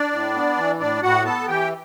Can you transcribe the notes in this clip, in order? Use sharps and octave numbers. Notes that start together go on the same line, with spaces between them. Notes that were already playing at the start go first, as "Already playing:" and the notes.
Already playing: D4 D5
A2
B3
E3
A2 D4 D5
A2 F#4 F#5
B3 A4 A5
E3 G4 G5